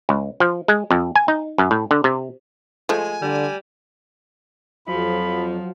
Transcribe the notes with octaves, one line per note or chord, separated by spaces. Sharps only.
C#2
F3
G#3
F2
G#5
D#4
F#2
A2
D3
C3
F3 G#3 A3 G#5
D3 G3
F2 F3 F#3 B5